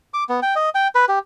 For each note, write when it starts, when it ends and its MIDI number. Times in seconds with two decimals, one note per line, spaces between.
0.14 0.24 86
0.29 0.40 59
0.42 0.55 79
0.56 0.69 75
0.75 0.88 79
0.95 1.05 71
1.08 1.19 67